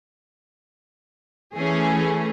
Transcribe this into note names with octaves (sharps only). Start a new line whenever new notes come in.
E3 A3 C#4 G#4